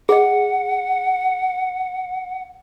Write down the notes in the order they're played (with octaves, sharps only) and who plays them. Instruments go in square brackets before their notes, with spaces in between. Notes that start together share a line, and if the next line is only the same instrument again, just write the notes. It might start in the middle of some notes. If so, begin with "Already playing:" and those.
[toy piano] G#4 D#5 [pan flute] F#5